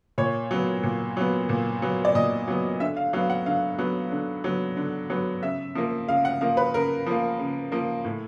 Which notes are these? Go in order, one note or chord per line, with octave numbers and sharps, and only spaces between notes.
A#2 C#5
F#3 B3
A#2
F#3 B3
A#2
F#3 B3
D5
A#2 D#5
F#3 B3
D3 E5
F5
F#3 B3 F5
F#5
D3 F5
F#3 B3
D3
F#3 B3
D3
F#3 B3
C#3 E5
F3 A#3
C#3 F5
F#5
F3 A#3 F5
B4
C#3 A#4
F3 A#3
C#3
F3 A#3
A2